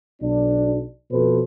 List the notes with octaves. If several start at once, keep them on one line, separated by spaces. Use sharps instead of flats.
B1 D4
F2 B2 A4 B4 C5